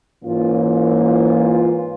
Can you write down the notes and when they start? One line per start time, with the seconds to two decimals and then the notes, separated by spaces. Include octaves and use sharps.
0.22 G#2 E3 A#3 C#4 F4
0.63 F4
1.01 F4
1.41 F4